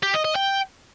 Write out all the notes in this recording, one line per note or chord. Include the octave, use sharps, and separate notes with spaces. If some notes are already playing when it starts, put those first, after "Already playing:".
G4
D#5
D#5
G5